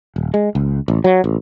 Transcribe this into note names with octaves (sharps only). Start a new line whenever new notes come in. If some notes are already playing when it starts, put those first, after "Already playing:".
D#1
G#3
C#2
A1
F#3
A1